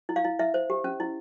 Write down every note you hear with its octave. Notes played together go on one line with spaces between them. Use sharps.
E4
F5
E4
E4 E5
C5
G4
C#4
E4